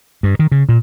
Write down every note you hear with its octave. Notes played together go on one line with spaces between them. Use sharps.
G2
D#3
C#3
A#2